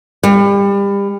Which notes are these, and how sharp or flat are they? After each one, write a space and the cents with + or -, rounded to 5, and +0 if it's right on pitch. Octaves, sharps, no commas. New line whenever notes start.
G3 +30